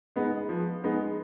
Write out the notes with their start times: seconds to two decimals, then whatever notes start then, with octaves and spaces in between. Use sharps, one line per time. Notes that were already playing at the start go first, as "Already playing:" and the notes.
0.16 G#3 B3 D#4
0.49 F3
0.84 G#3 B3 D#4